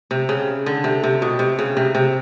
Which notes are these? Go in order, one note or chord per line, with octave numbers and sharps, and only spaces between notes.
C3
C#3
D3
C3
C3
B2
C3
C#3
C3
C3